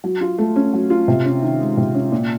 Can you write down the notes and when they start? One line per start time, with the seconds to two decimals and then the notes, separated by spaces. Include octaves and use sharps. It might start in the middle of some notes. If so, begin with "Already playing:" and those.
0.04 F#3
0.21 F4
0.38 A3
0.56 C#4
0.73 F#3
0.90 F4
1.08 C3
1.25 C#4
1.43 D#3
1.60 G#3
1.77 C3
1.95 C#4
2.12 A#2